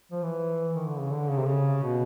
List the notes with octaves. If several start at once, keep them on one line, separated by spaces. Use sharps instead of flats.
F3
E3
D#3
D3
C#3
D3
C#3
C3
C#3
B2